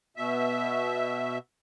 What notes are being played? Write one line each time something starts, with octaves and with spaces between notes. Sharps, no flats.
B2 E5